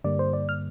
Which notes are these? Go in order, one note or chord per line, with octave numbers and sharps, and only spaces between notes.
G2 D3 G3 A#3 D5
C5
D5
F6